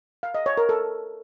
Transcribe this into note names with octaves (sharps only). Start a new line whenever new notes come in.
F5
D#5
C#5
A#4
A4